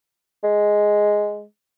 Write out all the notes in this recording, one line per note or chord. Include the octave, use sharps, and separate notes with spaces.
G#3